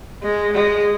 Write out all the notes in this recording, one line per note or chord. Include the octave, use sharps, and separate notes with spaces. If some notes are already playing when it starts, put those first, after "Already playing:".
G#3
G#3